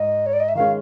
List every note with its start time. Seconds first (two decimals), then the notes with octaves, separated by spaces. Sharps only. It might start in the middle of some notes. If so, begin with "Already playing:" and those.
Already playing: G#2 D#5
0.26 C#5
0.33 D5
0.40 D#5
0.49 E5
0.55 D#3 G#3 C#4 F5